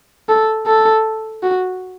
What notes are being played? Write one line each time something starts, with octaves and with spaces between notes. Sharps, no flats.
A4
A4
F#4